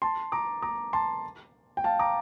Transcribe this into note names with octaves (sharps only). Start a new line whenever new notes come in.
A5 C6
A#5 D6
A#5 D6
A5 C6
G5
F5 A5
A#5 D6